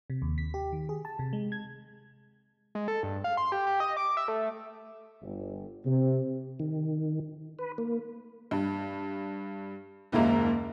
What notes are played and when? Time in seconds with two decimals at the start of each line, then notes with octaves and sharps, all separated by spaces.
0.10 C3
0.22 D#2
0.38 B6
0.54 G4
0.73 D#3
0.89 G#4
1.05 A5
1.19 C3
1.33 G#3
1.52 G#6
2.75 G#3
2.88 A4
3.03 G2
3.24 F5
3.37 C6
3.52 G4
3.67 G4
3.80 D#5
3.97 D6
4.17 E5
4.28 A3
5.22 G1
5.86 C3
6.60 D#3
7.59 B4
7.78 A#3
8.51 G2
10.12 F#1 D#2 G#2 A#3 E5 A#5